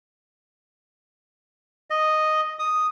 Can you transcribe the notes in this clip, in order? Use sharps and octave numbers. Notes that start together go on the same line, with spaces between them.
D#5
D#6